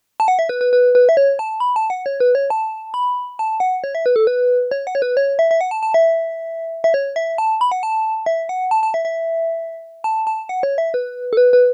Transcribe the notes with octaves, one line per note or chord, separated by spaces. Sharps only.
A5
F#5
E5
B4
B4
B4
B4
E5
C#5
A5
B5
A5
F#5
C#5
B4
C#5
A5
B5
A5
F#5
C#5
E5
B4
A4
B4
C#5
F#5
C#5
B4
C#5
E5
E5
F#5
A5
A5
E5
E5
C#5
E5
A5
B5
F#5
A5
E5
F#5
A5
A5
E5
E5
A5
A5
F#5
C#5
E5
B4
A4
B4
B4